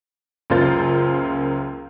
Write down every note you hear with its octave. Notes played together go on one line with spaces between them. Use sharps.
C#2 F#2 A#3 F4 C5 A6